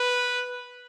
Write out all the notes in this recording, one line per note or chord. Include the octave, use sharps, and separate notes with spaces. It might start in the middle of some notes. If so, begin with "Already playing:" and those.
Already playing: B4